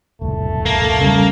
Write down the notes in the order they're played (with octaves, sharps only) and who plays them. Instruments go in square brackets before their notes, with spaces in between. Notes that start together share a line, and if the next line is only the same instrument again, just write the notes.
[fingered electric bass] E1 C2 [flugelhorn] A3
[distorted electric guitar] A#3
[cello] C#3 G3